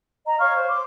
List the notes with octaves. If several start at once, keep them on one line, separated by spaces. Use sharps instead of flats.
D#5 A#5
C#5 F5 C#6 F6
C5
C6 D6